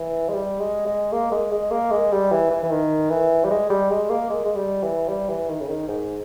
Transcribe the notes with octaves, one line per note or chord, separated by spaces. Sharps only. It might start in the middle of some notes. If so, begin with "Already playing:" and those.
Already playing: E3
G#3
G3
G#3
G#3
A#3
G#3
G#3
A#3
G#3
G3
E3
E3
E3
D#3
E3
G3
G#3
G3
G#3
A#3
G#3
G#3
G3
E3
G3
E3
D#3
C#3
D#3
G#2